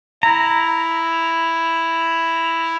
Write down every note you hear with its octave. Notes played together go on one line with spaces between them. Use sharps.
E4 A#5